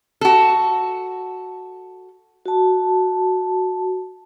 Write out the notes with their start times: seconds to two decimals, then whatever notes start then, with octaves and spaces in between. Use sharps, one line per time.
0.21 F#4 A4
2.46 F#4 A5